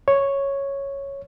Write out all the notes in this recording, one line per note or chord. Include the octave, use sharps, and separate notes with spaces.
C#5